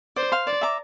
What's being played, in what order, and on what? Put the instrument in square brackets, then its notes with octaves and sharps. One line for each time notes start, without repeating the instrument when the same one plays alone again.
[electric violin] C5 [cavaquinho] D5
[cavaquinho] F5 C6
[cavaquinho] C5 [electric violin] D5
[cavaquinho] E5 A#5 D6